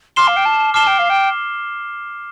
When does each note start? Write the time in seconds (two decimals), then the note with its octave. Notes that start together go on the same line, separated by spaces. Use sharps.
0.16 C6 D6 F6 C7 E7 G7
0.27 F5
0.36 G5
0.45 A5
0.74 A5 D6 F6 C7 E7 G7
0.87 G5
0.98 F5
1.09 G5